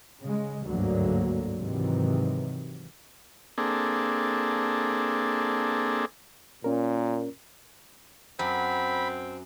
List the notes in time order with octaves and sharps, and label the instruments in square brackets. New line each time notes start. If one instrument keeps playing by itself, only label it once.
[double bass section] C#3 G#3
G1 D2 G#2 D3 F#3 A#3
G#2 C3 D#3 E3 F#3
[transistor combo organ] A#3 C4 D4 G#4 A4
[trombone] A#2 [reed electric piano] C#4 A#4
[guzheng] F#2 [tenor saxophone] C4 [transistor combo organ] B5